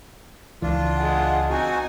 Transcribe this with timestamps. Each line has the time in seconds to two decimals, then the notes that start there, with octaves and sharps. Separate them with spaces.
0.62 C#2 E3 D4 F4
0.96 G#3 F#5
1.50 C4 D#4 F#4 G#5